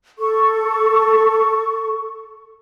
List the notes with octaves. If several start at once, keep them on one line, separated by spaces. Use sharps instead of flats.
A4 C#6